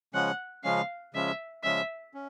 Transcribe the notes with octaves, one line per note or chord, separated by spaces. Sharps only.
C#3 F3 G#3 C#4 F#5
C#3 F3 G#3 C#4 F5
C#3 F3 G#3 C#4 E5
C#3 F3 G#3 C#4 E5
C#4